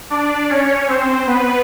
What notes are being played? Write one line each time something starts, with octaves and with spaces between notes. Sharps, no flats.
D4 D5
C#4 C#5
C4 C5
B3 B4